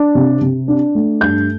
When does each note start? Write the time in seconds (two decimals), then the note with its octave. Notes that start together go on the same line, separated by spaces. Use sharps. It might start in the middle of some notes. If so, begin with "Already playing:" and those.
Already playing: D4
0.15 C3
0.41 C3
0.68 D4
0.95 A3
1.21 G2 G6